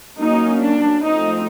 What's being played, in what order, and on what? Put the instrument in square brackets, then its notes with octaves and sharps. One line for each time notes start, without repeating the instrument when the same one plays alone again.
[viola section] F#3 A#3 C#4 D#4
D4
F3 A3 C4 D#4